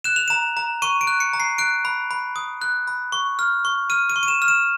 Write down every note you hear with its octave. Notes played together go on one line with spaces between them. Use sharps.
F#6 E7
F7
A#5 E7
A#5
C#6 D#7
D7
F#6
C#7
A#5
C7
F#6 D7
B5
B5
D#6
F#6
B5
C#6
F6
C#6
F6 D#7
D#7
C#6
D#7
E7
F6
E7